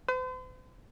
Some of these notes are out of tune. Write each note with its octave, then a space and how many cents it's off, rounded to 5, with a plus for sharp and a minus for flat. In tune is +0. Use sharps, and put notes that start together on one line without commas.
C5 -45